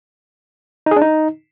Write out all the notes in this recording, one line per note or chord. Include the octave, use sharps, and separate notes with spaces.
D#4
G#4
D4
D#4